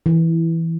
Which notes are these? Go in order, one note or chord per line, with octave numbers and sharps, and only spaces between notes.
E3